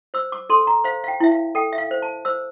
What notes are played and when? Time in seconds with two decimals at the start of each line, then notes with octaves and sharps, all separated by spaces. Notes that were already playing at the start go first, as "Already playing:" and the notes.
0.14 C5 E6
0.32 D6
0.50 A4 C6
0.67 A#5
0.84 C5 F5
1.04 F5
1.08 G5
1.20 E4 E5
1.31 F5
1.55 A4 G5
1.73 E5
1.78 F5
1.91 C5
2.02 A5
2.25 C5 E6